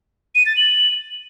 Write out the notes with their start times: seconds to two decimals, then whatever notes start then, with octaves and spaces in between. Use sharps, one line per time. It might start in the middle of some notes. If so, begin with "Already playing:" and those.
0.35 D#7
0.46 A6
0.57 F#7